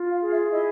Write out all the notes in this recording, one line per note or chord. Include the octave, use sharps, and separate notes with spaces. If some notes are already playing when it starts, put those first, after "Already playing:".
Already playing: F4
F5
G#4
E5
E4 D#5